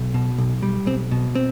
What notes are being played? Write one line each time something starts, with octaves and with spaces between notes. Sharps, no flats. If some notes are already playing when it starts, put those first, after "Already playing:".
Already playing: B1
B2
B1
G3
B1 C4
B2
C4